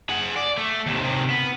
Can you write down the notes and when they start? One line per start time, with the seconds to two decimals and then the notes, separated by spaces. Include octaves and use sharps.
0.09 G#4 F#5
0.36 D5
0.58 A3
0.86 D#2 C3
1.02 C3 D#3
1.30 B3